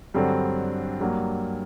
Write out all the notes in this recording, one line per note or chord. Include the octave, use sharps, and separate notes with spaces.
G2 D3 F#3 C4
G2 F#3 A#3